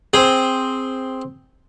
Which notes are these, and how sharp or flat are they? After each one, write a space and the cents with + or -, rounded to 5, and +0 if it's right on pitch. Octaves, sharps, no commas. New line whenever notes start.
C4 +0 G#4 +0